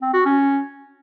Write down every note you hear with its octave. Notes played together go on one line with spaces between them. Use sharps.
C4
F#4
C#4